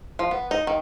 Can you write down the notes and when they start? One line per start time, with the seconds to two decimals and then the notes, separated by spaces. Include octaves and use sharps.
0.19 F3
0.31 B3
0.51 D#4
0.67 D#3